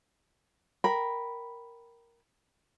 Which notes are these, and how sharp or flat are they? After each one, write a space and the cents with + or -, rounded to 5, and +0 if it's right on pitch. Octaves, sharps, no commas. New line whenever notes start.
A#4 +0 G5 -10 B5 +0